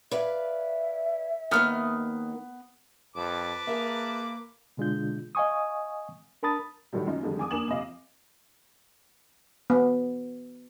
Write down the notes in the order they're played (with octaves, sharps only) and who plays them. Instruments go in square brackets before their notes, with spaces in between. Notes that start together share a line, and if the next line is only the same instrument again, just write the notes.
[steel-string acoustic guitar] B4 D5 F5 [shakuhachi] E5
[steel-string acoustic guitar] D#2 A#3 D#4 [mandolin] B3 F6
[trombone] F2 [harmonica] B4 A5 D6
[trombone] A#3 [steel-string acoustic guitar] G#4 A#4 E5
[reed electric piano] B2 D3 G#3 D4 F4 G6
D#5 F5 G#5 C#6 D#6
D4 A#4 A5 B5 D#6 A6
[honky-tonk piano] A2 D#3 F#3 G3
F#2 D#4 F4
F2 D3 D#3 F3 G3 G#3
G#5 D6 D#6
A#3 D4 G#5 E7 F#7
F2 C3 D#5 F5
[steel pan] B3